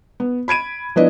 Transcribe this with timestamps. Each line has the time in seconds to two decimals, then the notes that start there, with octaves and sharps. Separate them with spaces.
0.20 B3
0.48 B5 G#6 D7 D#7
0.96 F3 B3 D4 E4 B4 D#5